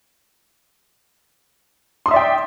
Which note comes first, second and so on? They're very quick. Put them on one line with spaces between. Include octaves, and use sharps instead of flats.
C6 D#6 E5 D5 G5